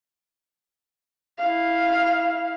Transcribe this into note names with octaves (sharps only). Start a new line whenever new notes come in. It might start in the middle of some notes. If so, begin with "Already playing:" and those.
E4 F5